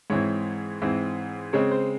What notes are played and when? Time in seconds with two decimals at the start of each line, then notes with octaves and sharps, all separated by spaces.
0.10 G#2 E3 C4 C#5
0.82 G#2 E3 C4
1.53 C#3 G#3 C4 C#5
1.71 C5